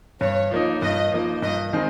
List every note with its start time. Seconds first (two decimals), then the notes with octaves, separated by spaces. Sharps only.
0.20 G2 C#5
0.51 F3 A#3 D#4
0.81 G2 D#5
1.11 F3 A#3 D#4
1.42 G2 D#5
1.73 D#3 G#3 C4 D#4